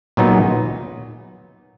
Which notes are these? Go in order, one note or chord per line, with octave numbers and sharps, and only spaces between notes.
A#2 F#3 B3 D#4 G#4